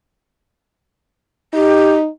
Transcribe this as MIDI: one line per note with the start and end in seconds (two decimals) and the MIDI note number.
1.54 2.08 63
1.54 1.93 67